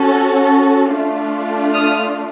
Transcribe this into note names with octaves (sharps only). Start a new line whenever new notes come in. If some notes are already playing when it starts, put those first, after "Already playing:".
Already playing: C#4 F#4 A4
A3 D4 F4
D#6 F6